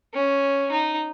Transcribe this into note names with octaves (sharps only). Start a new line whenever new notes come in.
C#4
D#4